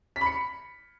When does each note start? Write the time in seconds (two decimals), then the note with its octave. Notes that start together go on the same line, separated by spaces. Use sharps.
0.16 B6
0.21 B5
0.26 C#7